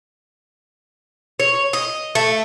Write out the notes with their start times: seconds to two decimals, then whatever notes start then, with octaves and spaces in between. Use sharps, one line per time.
1.40 C#5
1.73 D#5
2.15 A3